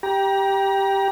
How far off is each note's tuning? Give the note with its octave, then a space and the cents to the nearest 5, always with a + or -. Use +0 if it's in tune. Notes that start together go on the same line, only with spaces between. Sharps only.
G4 +0 A#5 +35